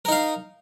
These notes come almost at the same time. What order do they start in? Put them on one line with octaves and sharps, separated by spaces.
A#4 D#4 F5